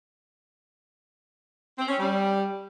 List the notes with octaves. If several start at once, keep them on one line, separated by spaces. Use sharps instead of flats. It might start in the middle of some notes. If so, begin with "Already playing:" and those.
C4
C#4
G3